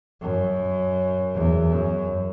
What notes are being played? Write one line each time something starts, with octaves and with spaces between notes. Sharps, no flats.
F#2
E2
F#2